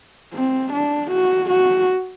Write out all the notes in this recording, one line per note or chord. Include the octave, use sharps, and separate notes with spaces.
C4
D4
F#4
F#4